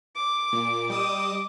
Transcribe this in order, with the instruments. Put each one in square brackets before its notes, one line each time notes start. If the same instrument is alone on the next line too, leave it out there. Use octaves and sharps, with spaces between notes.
[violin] D6
[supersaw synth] A#2
[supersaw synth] G3 D#6 E7 [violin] D#5 D6